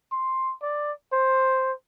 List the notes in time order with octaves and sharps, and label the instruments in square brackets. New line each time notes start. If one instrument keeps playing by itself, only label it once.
[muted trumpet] C6
D5
C5